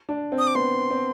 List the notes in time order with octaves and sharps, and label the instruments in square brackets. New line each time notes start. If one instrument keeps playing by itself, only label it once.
[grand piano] D4
C4
[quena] D#6
D6
[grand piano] B3 [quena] C6
[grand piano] C4